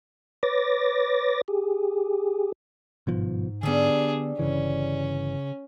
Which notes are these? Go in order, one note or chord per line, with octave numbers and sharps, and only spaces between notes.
B4 C#5 D6 A6 A#6
G4 G#4
G1 G#2 B2 F3
D3 G3 B3 D4 G#4 A4
G1 C#3 E3 C#4